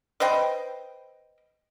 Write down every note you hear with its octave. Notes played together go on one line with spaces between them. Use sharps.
B4 C5 D#5 G5